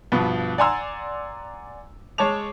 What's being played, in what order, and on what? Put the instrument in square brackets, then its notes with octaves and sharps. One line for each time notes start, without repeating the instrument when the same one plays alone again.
[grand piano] G2 B2 F3 B3
D5 F#5 G#5 A#5 C6 E6
G#3 C#5 A5 D6 F7